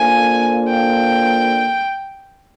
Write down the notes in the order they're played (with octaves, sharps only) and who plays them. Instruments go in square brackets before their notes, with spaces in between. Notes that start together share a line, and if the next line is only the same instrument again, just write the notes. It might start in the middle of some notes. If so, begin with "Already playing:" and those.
Already playing: [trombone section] A#3 D4 F4 A4 C5 [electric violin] G#5
[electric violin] G5